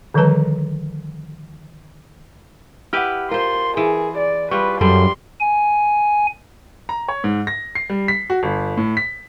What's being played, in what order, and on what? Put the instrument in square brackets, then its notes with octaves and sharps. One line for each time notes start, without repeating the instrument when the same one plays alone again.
[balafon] D3 D#3 F3 G3 B4 A5
[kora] E4 G4 B4 [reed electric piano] F#5 F6
[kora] F4 C5 [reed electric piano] A#4 [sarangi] C6
[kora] E3 [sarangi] G#4
[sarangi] D5
[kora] G3 F4 [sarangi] B4 [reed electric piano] C#6
[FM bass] F#2 [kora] G3 [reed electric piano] A4 [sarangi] C6
[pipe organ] G#5
[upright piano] A#5
C#5
G#2
A#6
C7
G3
B6
F#4
G1
A2
B6